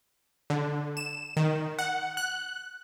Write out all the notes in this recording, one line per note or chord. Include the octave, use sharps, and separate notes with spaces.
D3
E7
D#3
F#5
F#6